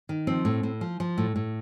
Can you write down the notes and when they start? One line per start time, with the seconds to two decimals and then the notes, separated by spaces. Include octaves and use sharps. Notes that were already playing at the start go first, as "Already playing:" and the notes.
0.09 D#3
0.27 F3 C4
0.45 A2
0.63 A2
0.81 F3
1.00 F3
1.18 A2
1.36 A2